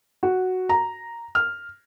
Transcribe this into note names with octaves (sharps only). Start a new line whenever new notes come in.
F#4
A#5
F6